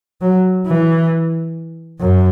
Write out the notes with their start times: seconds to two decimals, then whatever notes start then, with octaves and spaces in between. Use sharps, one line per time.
0.22 F#3
0.66 E3
2.00 F#2